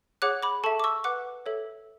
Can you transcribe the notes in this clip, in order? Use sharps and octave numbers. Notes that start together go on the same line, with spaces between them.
G#4 C#5 F#5 D6 F#6
B5 D6
A4 E5 A5 C#6
D6
C#6 E6
B4 F#5 D6 F#6
A4 C#5 E5